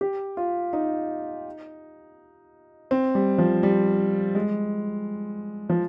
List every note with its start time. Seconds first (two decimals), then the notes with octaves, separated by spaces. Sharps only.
0.01 G4
0.37 F4
0.73 D#4
2.91 C4
3.15 G3
3.38 F3
3.63 G3
4.35 G#3
5.70 F3